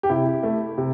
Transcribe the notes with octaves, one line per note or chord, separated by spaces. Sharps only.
G4
C3 E4
A3
C3